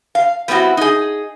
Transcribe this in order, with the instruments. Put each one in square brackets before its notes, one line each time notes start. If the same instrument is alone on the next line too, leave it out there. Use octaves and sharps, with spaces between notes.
[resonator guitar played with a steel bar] F5
G3 B3 C4 E4 F#4
D#4 G#4